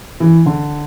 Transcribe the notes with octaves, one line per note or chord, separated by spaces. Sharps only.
E3
D3